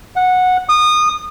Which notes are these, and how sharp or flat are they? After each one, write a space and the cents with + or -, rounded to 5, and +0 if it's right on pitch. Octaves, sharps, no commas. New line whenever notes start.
F#5 -15
D#6 -25